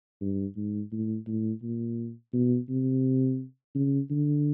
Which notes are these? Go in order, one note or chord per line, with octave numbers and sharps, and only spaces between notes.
G2
G#2
A2
A2
A#2
B2
C3
C#3
D3